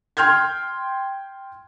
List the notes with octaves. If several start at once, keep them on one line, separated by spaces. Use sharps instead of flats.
G5 C6 F6 G6 G#6